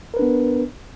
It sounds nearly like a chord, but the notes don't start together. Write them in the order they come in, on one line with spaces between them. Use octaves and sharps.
A#4 B4 D4 B3